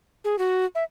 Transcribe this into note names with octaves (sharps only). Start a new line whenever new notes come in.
G#4
F#4
E5